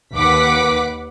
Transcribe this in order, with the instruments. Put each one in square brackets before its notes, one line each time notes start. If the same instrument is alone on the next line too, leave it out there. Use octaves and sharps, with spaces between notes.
[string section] D#2 B4 F#5 D6 B6